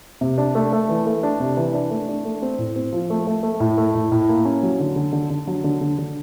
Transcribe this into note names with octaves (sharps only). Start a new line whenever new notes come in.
C3
D4
A3
A3
E3
A3
D4
C3
E3
D4
A3
D4
A3
C4
A2
C4
F3
A3
A3
A3
A2
A3
A2
A2
A#3
C#4
F#3
D3
D3
D3
D3
F#3
D3
D3
D3